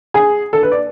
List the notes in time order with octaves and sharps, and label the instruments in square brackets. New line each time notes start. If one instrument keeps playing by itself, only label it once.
[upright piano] G#4
A4
B4
D5